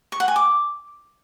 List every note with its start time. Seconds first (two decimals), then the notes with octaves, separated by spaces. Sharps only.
0.12 C#6
0.20 F#5
0.28 G#5
0.36 D6